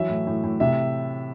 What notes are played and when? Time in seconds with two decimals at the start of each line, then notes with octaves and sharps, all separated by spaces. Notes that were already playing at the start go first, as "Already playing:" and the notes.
Already playing: E3 F#3 E5
0.09 A2
0.27 A2
0.44 A2
0.60 C3 E5